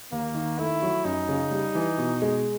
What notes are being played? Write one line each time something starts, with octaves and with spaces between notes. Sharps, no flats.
D#2 A#3
D#3
A3 E4
F#3
F#2 D#4
C#3
G3
E3
B2
G#3